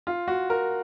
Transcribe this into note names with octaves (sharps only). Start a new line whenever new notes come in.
F4
F#4
A#4